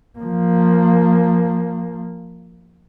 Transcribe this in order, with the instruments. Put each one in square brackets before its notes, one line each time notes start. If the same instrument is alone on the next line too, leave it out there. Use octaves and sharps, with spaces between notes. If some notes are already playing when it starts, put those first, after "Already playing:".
[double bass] F3 A#3